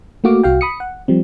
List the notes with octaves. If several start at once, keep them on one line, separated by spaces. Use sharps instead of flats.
A3 A#3 F#4 F5 D6
C2 F#4 F5 G5
B5 D#6 C#7
F#5
F3 G3 C4